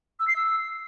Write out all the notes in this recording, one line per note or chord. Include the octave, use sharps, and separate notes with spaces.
E6
C7
E6